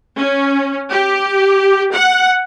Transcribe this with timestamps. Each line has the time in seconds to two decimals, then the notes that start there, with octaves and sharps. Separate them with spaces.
0.17 C#4
0.91 G4
1.93 F#5